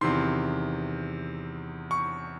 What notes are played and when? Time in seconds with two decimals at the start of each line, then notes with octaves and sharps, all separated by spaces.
0.01 E2 C3 D#3 C6
1.91 C#6